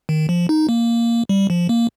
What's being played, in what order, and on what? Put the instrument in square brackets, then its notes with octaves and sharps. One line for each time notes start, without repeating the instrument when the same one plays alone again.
[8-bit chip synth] D#3
F3
D#4
A#3
G3
F3
A#3